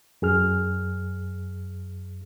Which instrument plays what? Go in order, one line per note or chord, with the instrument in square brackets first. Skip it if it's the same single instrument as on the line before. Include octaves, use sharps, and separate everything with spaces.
[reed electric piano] F#2 G#4 F6